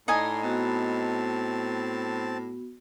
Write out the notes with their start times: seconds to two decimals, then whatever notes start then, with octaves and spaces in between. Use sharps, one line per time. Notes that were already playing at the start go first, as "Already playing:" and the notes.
0.08 A2 D#4 D5 D#5 G#5 C6
0.42 B3 C4 F#4 A5